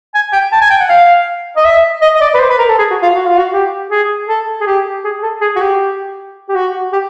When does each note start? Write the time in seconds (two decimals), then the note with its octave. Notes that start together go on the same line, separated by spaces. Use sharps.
0.14 G#5
0.33 G5
0.52 A5
0.61 G#5
0.70 G5
0.80 F#5
0.89 F5
1.56 D#5
1.65 E5
2.02 D#5
2.15 D#5
2.21 D5
2.34 B4
2.40 C5
2.49 B4
2.58 A#4
2.69 A4
2.78 G#4
2.91 F#4
3.02 F4
3.15 F#4
3.27 F4
3.38 F#4
3.52 G4
3.91 G#4
4.28 A4
4.61 G#4
4.66 G4
5.04 G#4
5.23 A4
5.41 G#4
5.56 F#4
5.61 G4
6.49 G4
6.55 F#4
6.93 G4